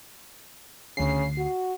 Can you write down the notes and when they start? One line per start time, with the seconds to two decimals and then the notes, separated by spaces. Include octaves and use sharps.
0.97 D2 C#3 C7
1.38 F#4